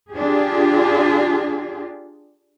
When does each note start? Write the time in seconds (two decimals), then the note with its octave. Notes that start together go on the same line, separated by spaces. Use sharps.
0.11 D4 F4 G4 G#4